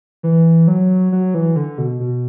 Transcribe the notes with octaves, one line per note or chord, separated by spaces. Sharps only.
E3
F#3
F#3
E3
D3
B2
B2